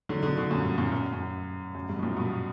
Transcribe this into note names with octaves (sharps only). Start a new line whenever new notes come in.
D3 F#3
B2 D3
B2 D3
F#2 A#2
G2
F#2 A#2
F#2
F#2
F#2
G2
B2
F#2 A#2
G2 B2